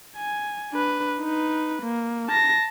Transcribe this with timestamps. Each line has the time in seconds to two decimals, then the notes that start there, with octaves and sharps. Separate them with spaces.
0.16 G#5
0.72 D4 B4
1.20 D#4 B4
1.83 A#3
2.29 A5 A#6